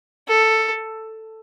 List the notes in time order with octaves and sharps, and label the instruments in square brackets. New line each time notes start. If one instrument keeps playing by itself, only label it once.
[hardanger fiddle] A4